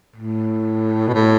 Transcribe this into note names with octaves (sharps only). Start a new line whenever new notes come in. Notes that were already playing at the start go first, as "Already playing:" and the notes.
A2
B2
A2